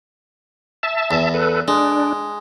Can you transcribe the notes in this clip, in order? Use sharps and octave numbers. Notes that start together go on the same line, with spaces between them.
E5 A5
E2
A4 B4
G#3 D4